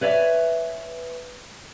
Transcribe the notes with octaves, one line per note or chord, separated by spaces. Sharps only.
B4 C#5 D5 E5 F5 G#5